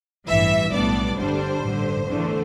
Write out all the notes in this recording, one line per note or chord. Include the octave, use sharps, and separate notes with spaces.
A1 G2 E3 E5
B1 A2 G3 B3 D4 D5
G1 G2 D3 G3 D4 C5
A1 G2 D3
E2 D3 A3